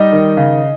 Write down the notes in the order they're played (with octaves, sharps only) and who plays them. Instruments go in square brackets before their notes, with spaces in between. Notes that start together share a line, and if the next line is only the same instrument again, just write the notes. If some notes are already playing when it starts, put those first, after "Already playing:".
Already playing: [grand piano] G3 D#4 D#5
D#3
C#3